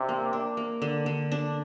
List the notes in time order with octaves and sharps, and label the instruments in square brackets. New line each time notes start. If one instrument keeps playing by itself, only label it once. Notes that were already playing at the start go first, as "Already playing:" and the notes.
Already playing: [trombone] C3 [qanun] D4
[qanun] A#3
D4
A#3
D3
D3
D4